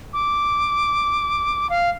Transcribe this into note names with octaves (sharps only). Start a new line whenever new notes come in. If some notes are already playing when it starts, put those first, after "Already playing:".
D6
F5